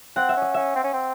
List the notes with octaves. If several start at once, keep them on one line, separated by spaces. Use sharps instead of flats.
C4 F#5
E5
C#4
D#5
C#4 E5
C4
C#4
C4